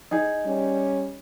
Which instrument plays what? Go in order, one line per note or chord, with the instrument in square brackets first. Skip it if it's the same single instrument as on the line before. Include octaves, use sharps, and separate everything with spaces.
[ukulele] D#4 G#4
[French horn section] G3 C#4